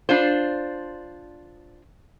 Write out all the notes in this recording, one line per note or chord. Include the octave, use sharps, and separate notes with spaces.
D4 F4 C5